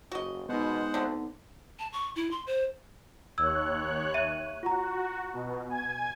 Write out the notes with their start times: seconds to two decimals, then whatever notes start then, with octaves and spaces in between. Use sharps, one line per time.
0.12 F#1 F#4 D#5
0.49 B2 G#3 B3 D#4 C5 F#5
0.94 D2 D3 C4
1.79 A5
1.93 C#6
2.16 E4
2.31 C6
2.47 C5
3.38 D#2 C#5 E6 F#6 G#6
4.14 E5 D#7
4.63 F4 F#4 A#5
5.33 B2
5.70 G#5 G#6